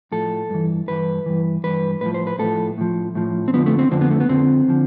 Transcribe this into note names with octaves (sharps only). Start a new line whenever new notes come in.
A2 F3 A4
G2 E3
G2 E3 B4
G2 E3
G2 E3 B4
A2 F3 B4
C5
B4
A2 F3 A4
A2 F3
A2 F3
C4
F2 D3 F3 B3
A3
C4
F2 D3 F3 C4
B3
A3
B3
F2 D3 F3 C4
D3 F3